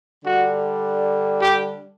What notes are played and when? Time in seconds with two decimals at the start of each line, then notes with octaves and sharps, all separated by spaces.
0.24 D3 G3 D4 F#4
1.41 G4